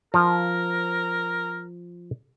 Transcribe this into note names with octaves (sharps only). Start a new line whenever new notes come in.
F3 A#4